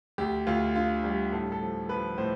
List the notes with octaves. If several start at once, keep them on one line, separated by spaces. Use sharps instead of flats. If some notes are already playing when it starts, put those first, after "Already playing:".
D2 G4
D2 F4
D3 F4
G3 G4
A2 A4
A4
F3
F3 B4
A2 C5